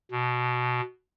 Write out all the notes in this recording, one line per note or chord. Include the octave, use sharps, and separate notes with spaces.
B2